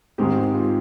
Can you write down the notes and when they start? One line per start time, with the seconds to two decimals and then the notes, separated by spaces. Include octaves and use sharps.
0.18 G#2 D#3 G#3 C4 G4
0.36 G4
0.54 F4